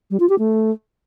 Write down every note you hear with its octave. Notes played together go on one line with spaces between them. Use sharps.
G3
F4
G4
A3